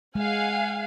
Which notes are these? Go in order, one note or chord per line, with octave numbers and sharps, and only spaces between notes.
G#3 F5 F#5 G#5